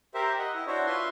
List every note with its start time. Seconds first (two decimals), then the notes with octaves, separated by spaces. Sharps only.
0.14 G4 A#4 C5 E5
0.39 D#5 F#5
0.54 E4
0.67 D4 E4 F#4 C5 C#5
0.86 F4 B4 E5 C6